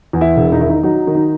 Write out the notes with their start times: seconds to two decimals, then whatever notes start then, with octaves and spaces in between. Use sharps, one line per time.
0.13 E2
0.21 E4
0.36 E1
0.52 D#4
0.60 D#3 E4
0.70 D#4
0.83 F#3 D#4
1.07 D#3
1.15 D#4